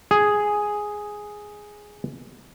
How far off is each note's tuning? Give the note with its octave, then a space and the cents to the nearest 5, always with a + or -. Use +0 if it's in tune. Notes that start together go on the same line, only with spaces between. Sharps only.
G#4 +0